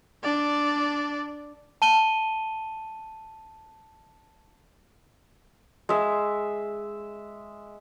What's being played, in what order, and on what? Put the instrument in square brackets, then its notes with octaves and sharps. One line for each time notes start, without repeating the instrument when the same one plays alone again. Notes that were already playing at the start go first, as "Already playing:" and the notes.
[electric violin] D4 D5
[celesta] A5 D#7 G7
[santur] G#3 E5